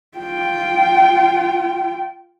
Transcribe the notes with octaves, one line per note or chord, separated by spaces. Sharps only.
F4 G5